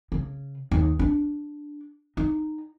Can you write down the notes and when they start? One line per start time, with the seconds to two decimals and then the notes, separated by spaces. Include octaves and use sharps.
0.12 C#3
0.71 D#2
0.99 D4
2.17 D#4